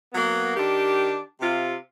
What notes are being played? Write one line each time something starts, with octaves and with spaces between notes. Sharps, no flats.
F#3 A#3 B3
D#3 D4 G4
C3 F4